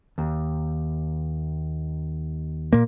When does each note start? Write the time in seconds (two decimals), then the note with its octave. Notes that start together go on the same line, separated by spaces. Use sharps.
0.18 D#2
2.73 A#2 A#3